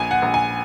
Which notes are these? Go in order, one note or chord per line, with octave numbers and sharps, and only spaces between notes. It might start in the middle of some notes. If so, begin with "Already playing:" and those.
Already playing: A#1 G#5
F#5
A#1
G#5